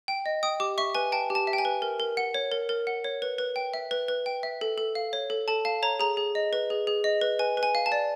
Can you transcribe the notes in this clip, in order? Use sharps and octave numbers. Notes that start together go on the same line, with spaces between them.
G5
D#5
G5 D#6
G4 D6
E5 C#6
B4 G#5
G5 A5
G4
A5
E5
G5
G#5
B4
A#4
A#4
F#5
C#5
A#4
A#4
F#5
C#5
B4
B4
G5
E5
B4
B4
G5
E5
A4
A4
F5
C#5
A4
A4 A5
F5 A5
C#5 A#5
G#4 A#5
G#4
D#5
B4
G#4
G#4
D#5
B4
B4 G#5
B4
G#5
F5
A5
D5